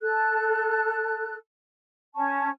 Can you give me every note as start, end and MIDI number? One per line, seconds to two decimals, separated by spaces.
0.01 1.36 69
0.01 1.36 90
2.15 2.49 61
2.15 2.49 81
2.15 2.49 85